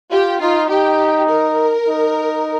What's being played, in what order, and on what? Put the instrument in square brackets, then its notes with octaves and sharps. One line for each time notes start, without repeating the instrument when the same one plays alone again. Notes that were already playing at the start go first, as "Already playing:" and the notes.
[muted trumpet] F4 [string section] G4
[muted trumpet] D#4 [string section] F4
[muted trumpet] D#4 [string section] G4
[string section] A#4
[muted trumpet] D#4